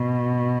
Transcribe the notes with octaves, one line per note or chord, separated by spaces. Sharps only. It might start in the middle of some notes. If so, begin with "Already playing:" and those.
Already playing: B2